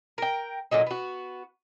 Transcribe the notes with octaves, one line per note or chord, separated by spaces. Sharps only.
A#4 G5
A#2 D3 F#3 D#4
B3 F#4